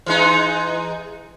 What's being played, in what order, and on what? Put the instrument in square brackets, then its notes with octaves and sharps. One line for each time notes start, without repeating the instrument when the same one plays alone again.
[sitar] E3 G#3 D#4